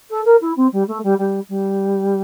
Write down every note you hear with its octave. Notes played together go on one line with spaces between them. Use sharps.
A4
A#4
E4
C4
G3
A3
G3
G3
G3